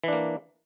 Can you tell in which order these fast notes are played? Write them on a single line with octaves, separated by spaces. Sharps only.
E3 D4 A#3